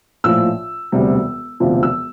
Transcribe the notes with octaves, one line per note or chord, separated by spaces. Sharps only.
A#1 A2 F3 E6
E1 D2 C3 G3
E1 D2 C3 F3
E6